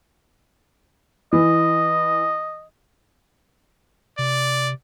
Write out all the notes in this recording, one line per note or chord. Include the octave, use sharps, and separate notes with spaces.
E3 D#5
C3 D5